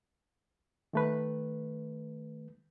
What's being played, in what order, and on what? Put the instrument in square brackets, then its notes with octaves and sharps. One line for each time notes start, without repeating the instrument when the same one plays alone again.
[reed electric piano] D#3 A3 B4